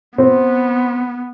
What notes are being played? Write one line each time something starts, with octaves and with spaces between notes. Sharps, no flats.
B3 C4